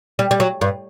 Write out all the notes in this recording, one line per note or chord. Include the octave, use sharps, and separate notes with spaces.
G3
G3
F#3
G2